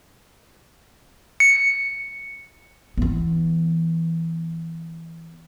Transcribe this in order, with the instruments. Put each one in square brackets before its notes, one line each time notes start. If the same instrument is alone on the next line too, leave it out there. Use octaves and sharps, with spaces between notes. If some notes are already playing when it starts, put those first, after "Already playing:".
[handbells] C#7
[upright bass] E3 B3